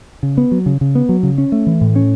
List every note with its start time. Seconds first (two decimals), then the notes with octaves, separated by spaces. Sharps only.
0.23 C#3
0.38 B3
0.52 F#3
0.66 C#3
0.81 C#3
0.95 B3
1.09 F#3
1.23 C#3
1.38 C#4
1.52 A3
1.67 E3
1.81 A2
1.96 C#4